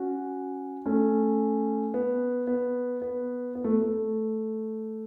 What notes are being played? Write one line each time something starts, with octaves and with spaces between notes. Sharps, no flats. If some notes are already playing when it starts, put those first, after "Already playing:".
Already playing: C#4 F#4
A3 C#4
B3
B3
B3
B3
A3
A3